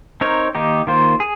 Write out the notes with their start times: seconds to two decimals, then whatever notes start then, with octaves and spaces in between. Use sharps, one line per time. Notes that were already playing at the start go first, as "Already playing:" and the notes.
0.21 C4 D#4 A#4 C#5
0.55 D#3 A#3 D#4 G4
0.87 D#3 A#3 F4 C5
1.20 G#4